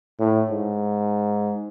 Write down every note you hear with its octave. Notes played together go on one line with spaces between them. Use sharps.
A2
G#2